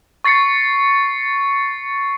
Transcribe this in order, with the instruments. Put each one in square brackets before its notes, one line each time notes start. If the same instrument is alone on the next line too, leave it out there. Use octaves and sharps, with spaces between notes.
[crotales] C#6 A6 C7 C#7